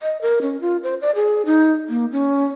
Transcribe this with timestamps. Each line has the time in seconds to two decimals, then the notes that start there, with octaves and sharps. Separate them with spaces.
0.02 D#5
0.21 A#4
0.42 C#4
0.61 F4
0.83 C5
1.02 D5
1.15 G#4
1.46 D#4
1.89 A#3
2.12 C#4